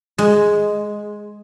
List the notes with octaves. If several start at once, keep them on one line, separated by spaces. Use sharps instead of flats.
G#3